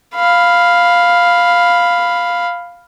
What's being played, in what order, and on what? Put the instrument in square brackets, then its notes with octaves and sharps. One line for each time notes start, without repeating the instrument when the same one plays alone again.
[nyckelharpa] F5 B5